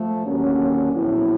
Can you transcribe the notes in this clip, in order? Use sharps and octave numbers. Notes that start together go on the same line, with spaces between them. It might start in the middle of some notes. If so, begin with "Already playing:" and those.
Already playing: F3 A3
D#2 D3 F#3 A#3 C#4
A#1 A2 F#3 B3 E4